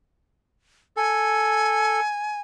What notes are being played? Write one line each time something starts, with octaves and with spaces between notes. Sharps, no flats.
A4 G#5